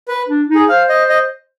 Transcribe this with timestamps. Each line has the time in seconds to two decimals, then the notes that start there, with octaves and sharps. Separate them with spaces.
0.08 B4
0.29 D4
0.49 D#4
0.55 G#4
0.69 C5 F5
0.89 D#5
1.09 D#5